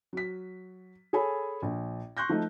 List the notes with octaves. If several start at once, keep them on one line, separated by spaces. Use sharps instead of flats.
F#3 B6
G#4 A4 C#5 G#5 B5
A#1
C6 C#6 F#6 G6 A#6
F3 A3 D#4